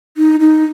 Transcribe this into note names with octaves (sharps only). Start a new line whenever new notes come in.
D#4
D#4